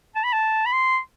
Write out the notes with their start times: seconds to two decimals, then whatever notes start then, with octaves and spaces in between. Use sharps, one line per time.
0.16 A5
0.24 B5
0.33 A5
0.66 B5
0.73 C6